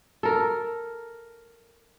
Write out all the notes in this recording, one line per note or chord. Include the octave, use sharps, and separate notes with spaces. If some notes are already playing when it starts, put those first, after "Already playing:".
A4 A#4